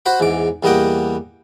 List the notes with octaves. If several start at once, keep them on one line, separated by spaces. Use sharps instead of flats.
F#4 C5 F#5 B5
E2 G#2 D6
E2 G3 A#3 D#5 F#5 G5